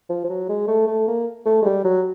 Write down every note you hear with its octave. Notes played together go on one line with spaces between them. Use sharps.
F3
F3
F#3
G#3
A3
A3
A#3
A3
G#3
G3
F#3